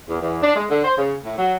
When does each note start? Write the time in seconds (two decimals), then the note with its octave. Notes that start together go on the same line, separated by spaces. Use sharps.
0.08 E2
0.21 E2
0.43 D4
0.55 G#3
0.70 D3
0.84 C5
0.97 C#3
1.23 A2
1.37 F#3